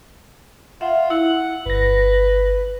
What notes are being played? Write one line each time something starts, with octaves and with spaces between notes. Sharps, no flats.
F4 E5 F#5
E4 F#5
G1 B4 A#6